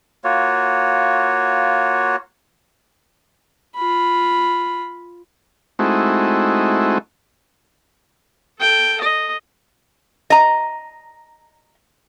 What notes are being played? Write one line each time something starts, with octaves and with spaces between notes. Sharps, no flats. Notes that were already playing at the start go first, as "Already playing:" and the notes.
A#3 F4 F#4 C#5
F4 B5
G#3 A3 C4 D#4 E4 F#4
A4 G5
D#5
D#5 A#5